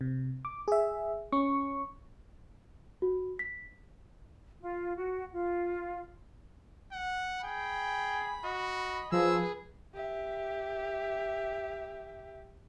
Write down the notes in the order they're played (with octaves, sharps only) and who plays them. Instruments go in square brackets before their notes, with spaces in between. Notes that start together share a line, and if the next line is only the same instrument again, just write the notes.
[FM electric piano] C3
D6
G#4 E5
C#4 C#6
[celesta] F#4
B6
[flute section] F4
F#4
F4
[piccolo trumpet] F#5
[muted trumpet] G#4 [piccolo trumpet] G5 [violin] B5
[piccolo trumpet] F#4 [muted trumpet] D#5
[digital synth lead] F3 [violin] G#4 B4 [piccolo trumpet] E6
[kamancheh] G4 E5